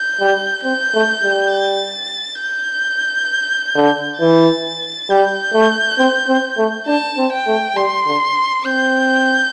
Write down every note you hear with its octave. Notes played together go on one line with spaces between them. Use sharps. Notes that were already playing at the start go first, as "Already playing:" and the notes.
Already playing: G6
G3
C4 G6
A3
G3
A6
G6
D3
E3 A6
G3 G6
A3
C4
C4
A3
D4 A5
C4
G5
A3
G3 C6
D3
C4 G6